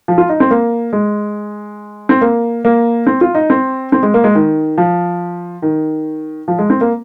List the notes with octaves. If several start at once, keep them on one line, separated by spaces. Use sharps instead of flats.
F3
F4
D#4
C4
A#3
G#3
C4
A#3
A#3
C4
F4
D#4
C4
C4
G#3
A#3
G#3
D#3
F3
D#3
F3
G#3
C4
A#3